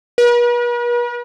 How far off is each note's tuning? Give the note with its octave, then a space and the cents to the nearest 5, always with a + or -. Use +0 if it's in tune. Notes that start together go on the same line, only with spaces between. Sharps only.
B4 -45